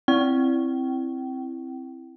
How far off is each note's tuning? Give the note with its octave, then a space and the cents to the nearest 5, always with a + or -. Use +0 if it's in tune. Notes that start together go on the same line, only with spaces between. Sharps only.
C4 +10 E4 +5 G5 -35